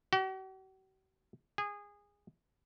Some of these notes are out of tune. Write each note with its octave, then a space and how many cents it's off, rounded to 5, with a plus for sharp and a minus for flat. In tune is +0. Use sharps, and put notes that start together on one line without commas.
F#4 +45
G#4 -20